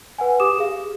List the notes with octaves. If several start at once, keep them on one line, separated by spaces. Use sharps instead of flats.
B4 F#5 G#5
G4 D6 D#6 E7
G4 G#4 F5